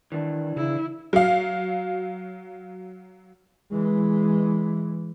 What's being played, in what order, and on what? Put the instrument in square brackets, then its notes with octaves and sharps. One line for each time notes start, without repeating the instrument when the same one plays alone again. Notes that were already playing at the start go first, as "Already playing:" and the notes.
[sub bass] D#3 [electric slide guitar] E3 D4
[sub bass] C#3 [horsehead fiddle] E4
[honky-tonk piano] F#3 F5
[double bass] E3 G#3